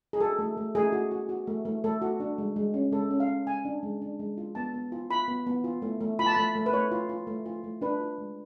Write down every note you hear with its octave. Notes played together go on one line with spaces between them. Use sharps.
G#4
F#4 A4
A3
A3
A3 G#4
F#4
F#4
F#4
A3
A3
A3 A4
F#4
D4
G#3
G#3
C#4
G#3 A4
C#4
F5
C#4
G#3 G#5
D4
G#3
D4
G#3
F4
B3 A5
B3
F4
F4 B5
B3
B3
F4
A3
A3
F4 B5
A5
A3 B5
A3
B4
A3 C#5
F4
F4
A3
F4
A3
D4 B4
F4
G#3